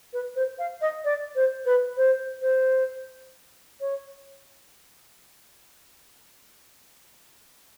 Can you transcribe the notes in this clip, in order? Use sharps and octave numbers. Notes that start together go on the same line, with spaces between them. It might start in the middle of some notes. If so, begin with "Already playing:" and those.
B4
C5
F5
D#5
D5
C5
B4
C5
C5
C#5